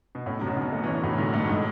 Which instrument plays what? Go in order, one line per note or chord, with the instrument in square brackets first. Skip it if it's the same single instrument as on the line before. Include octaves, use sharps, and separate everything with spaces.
[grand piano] B2
[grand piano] A2 [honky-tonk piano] C#4
[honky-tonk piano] F#2 [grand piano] C#3
[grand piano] B2
[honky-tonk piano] D3
A3
[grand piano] E3
[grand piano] D3 [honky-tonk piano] C#4
[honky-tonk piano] F#2 [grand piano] A2
[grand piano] A2 [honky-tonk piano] D3
[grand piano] G#2 [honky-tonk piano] A3
[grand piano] G#2
[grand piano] A2 [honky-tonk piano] G#3